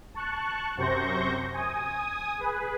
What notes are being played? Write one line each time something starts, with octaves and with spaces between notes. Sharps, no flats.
A5 C#6 F#6
F#2 C3 C5 C#6 G6 A#6
G#5 D#6
G#4 B4